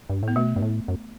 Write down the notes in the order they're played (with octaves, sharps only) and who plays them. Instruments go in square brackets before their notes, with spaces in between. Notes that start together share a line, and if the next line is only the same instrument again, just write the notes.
[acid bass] G2
[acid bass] A2 [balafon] B3
[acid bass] B2 [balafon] A3
[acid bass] G2
A2
F#2